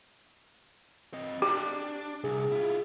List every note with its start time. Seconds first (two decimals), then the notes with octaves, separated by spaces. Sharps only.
1.14 C4 D#5
1.42 D4 G4
2.24 C2 G#4
2.52 E4 F4